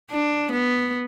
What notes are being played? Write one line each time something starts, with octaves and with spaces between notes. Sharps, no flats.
D4
B3